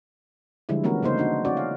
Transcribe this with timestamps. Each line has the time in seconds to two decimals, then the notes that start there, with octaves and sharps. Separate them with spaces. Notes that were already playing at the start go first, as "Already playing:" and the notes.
0.69 D3 F3 G3 G#3 E4
0.84 E3 A3 B3 C#4 F#4 A#4
1.02 C#3 A#3 D#4 C5
1.18 D4 D#4 F#4
1.45 C#4 F#4 D5
1.57 F5